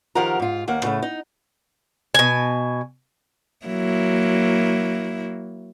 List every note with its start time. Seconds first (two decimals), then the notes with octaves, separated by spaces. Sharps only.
0.15 D#3 F3 G4 A#4 F#5 A#5
0.40 G#2 F4
0.68 D#2 A#3 F#5
0.83 A2 C#3 A3
1.02 D#4
2.15 B2 G#5
3.66 F#3 A#3 E4